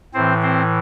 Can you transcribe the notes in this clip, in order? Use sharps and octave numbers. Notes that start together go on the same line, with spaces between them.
A2 E3 C4 C5
C4 C5